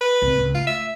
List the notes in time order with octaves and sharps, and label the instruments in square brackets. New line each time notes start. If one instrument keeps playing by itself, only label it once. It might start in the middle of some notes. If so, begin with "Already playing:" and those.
[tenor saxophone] B4
[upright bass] C2
C#2 A#2
[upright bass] A3 [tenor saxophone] F4
[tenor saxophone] E5